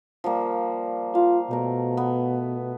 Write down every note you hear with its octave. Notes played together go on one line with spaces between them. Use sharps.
F3 G3 A#3
F4 F5
B2 A3 A#4
B3